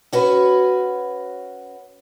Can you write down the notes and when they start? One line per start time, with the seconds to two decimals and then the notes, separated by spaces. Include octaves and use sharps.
0.13 C#4 F#4 B4